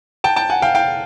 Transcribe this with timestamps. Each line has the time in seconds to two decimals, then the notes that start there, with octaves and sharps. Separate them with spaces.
0.24 G5 A5
0.36 G5 A5
0.50 F#5 G#5
0.62 F5 G5
0.75 F5 G5